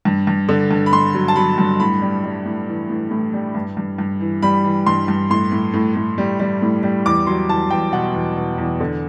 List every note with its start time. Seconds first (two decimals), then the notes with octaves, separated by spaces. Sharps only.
0.05 G2
0.27 G2
0.49 D3
0.71 G2
0.86 B5
0.93 G2 C6
1.14 F#3
1.28 A5
1.36 F#3 B5
1.58 G2
1.80 A2 B5
2.01 G3
2.24 G3
2.45 A2
2.68 E3
2.90 A2
3.11 A2
3.33 G3
3.55 G2
3.77 G2
3.98 G2
4.21 E3
4.42 G3 B5
4.64 E3
4.86 G2 C6
5.08 G2
5.30 A2 C6
5.51 A2
5.74 A2
5.95 A2
6.18 G3
6.40 G3
6.62 A2
6.83 G3
7.06 E2 D6
7.27 F#3 C6
7.49 E2 A5
7.70 E2 G5
7.93 B2 F#5
8.15 E2
8.37 B2
8.58 E2
8.80 D3